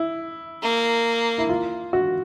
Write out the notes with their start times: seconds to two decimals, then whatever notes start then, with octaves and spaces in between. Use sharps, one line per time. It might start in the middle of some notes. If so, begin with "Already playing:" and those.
Already playing: E4
0.62 A#3
1.38 E4
1.49 F4
1.93 F#4